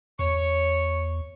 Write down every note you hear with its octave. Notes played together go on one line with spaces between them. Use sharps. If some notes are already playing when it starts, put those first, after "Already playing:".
E2 C#5 C#6